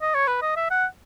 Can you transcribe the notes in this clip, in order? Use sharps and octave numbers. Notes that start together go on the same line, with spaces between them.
D#5
C#5
B4
D#5
E5
F#5